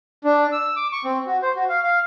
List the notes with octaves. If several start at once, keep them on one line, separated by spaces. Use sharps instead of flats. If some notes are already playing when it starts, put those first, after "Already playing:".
D4
E6
D6
C#6
C4
F#4
C5
F#4
F5
F5